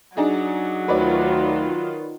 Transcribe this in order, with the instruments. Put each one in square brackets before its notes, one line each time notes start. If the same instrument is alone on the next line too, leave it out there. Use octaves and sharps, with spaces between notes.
[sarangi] F#3 [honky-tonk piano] D4 D#4 G#4
[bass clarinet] D2 [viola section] D#3 F4 [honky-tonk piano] B4 C#5 D5